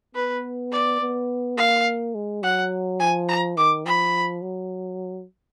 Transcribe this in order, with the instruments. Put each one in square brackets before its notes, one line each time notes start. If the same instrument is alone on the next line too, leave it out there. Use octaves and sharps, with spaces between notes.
[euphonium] B3 [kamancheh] B4
[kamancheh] D5
[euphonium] B3
[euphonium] A#3 [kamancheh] F5
[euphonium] G#3
[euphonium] F#3 [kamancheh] F#5
[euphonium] F3 [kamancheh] G#5
[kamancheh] A#5
[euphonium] D#3 [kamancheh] D6
[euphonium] F3 [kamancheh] B5
[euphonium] F#3